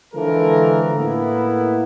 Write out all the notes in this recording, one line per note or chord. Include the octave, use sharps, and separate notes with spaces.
D3 E3 F3 G#3 A4 A#4
A2 A#3 B3 E4